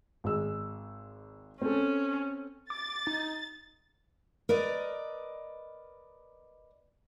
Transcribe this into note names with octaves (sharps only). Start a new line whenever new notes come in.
G#1 G#3 E6
C4 C#4 A4
D6 A6
D#4
A#4 B4 D5 D#5